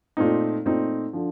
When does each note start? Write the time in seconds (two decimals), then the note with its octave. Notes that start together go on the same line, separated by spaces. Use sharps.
0.17 A#2 A3 C4 D#4
0.65 A#2 A3 C4 D#4
1.13 D3 F3